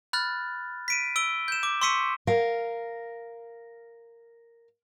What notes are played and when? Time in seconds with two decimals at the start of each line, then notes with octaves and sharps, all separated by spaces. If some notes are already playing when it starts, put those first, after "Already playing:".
0.13 B5 F6 F#6 A6
0.88 B6 D7 D#7
1.16 E6 D7 G7
1.48 G6 E7
1.63 D6
1.82 C6 C#6 E6 B6 C#7 D#7
2.27 A#4 F5